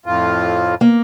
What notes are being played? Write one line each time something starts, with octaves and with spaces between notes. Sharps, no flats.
F2 A2 F4
A#3